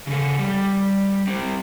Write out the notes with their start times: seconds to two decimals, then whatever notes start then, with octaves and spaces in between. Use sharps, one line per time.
0.07 C#3 A4
0.39 G3
1.27 G3 C4